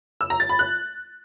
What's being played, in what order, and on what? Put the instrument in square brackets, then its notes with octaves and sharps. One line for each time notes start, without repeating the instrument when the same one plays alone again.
[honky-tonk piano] E6
A#5
A6
B5
F#6